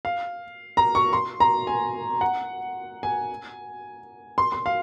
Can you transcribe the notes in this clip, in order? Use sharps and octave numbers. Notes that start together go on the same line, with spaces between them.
F5
A#5
C#6
C6
A#5
G#5
F#5
G#5
C6
C6
F5